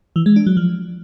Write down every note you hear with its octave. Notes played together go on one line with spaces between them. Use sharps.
E3
G#3
D4
F#3
F3